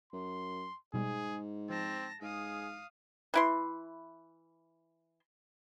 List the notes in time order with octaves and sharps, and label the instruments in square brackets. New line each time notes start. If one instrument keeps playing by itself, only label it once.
[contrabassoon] F#2 [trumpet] C6
[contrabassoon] G#2 [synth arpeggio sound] B2 G3 [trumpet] G#4
[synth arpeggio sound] F3 [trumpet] C4 [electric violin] A5 A#6
[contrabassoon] G#2 [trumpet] G#4 [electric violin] F5 D#6
[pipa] E3 E4 C6